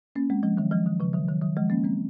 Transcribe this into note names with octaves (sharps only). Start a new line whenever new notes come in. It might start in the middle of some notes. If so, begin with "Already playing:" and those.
A#3 C#4
G#3 C4
F3 G#3
D#3 F#3
F3 G#3
D#3 F#3
C#3 F3
D#3 F#3
D#3 F#3
D#3 F#3
F3 G#3
A#3 C#4
G#3 C4